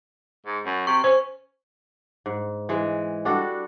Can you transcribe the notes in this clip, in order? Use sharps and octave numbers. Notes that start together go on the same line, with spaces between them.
G#2
F#2
C3 C#6
C#4 C5
G#2
E3 G#3
G3 D4 F#4 A4